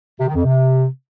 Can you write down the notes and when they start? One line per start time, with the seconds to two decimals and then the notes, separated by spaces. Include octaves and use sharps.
0.20 C3
0.28 D#3
0.36 F2
0.44 C3